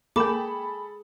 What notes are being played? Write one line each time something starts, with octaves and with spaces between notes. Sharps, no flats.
A#3 G#4 A4 G5 B5 D6 E7